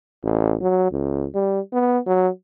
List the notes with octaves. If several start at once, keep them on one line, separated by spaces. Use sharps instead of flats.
A1
F#3
C#2
G3
B3
F#3